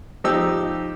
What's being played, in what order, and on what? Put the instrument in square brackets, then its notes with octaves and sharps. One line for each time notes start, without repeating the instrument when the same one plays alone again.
[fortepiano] F3 D#4 G4 E6